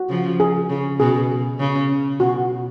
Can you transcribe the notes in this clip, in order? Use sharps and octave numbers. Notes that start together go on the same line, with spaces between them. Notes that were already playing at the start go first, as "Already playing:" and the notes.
Already playing: F#4
C#3 F3
G#4
C#3
B2 G#4
C#3
B2 F#4